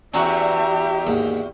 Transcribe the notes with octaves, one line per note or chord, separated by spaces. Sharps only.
E2 C#4 F#4 G4 E5 A#5
D#2 G#2